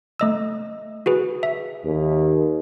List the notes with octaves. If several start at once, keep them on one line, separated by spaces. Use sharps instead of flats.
A3 D#5 E6
F#4 G#4 B4
E5
D#2